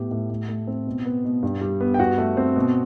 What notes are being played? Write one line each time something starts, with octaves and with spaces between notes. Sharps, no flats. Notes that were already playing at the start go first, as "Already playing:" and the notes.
Already playing: A2 B3 G4
A2
A2
A3
C4
B2
B3
B2
G2
G3
B3
G5
G2 F#4 F#5
A3
C4
B2